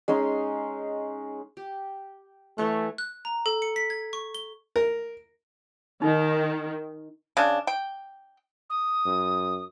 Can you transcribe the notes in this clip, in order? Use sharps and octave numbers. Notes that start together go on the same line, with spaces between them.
G#3 C#4 D#4 C6
G4
E3 A3 C#5 F#5
F#6
A#5
A4
C#7
B6
G#6
C#6
G7
A#4
D#3 D#4
C#3 D4
G5
D#6
F#2